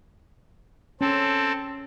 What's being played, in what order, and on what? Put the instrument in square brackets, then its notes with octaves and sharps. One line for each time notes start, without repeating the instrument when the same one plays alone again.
[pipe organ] C4 A4 [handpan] C#4